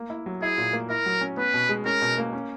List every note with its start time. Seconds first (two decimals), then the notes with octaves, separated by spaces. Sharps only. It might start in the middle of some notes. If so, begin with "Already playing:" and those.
Already playing: A#3
0.10 E4
0.26 F#3
0.42 E4 G#4
0.58 A#2
0.73 A#3
0.89 E4 A#4
1.06 F#3
1.21 C#4
1.37 B3 B4
1.54 B2
1.69 G#3
1.86 C#4 A#4
2.02 B2
2.18 A#3
2.33 C#4